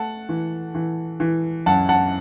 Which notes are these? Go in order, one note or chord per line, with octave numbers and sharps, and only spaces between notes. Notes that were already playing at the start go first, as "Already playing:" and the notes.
Already playing: A3 F#5 A5
E3
E3
E3
F#2 F#5 A5
F#5 A5